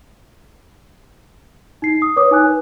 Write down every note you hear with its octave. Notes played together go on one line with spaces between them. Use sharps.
D#4 C7
D#6
B4 C#5 D6 D#6
D#4 G#5 F#6
B4